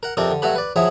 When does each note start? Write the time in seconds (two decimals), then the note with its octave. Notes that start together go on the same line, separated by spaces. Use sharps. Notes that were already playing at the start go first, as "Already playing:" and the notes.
0.03 A#4 F#5
0.17 F2 C3 C4 D4 A#4
0.31 D3
0.42 G2 F#3 A3 F#4 C#5 B5
0.56 B4 D5
0.76 F3 F#3 E4 G#4 E5